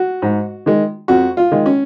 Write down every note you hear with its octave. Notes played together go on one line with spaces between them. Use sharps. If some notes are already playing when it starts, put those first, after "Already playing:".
Already playing: F#4
G#2
D#3 G#3
F2 F#4
F4
D#3 G#3
C#4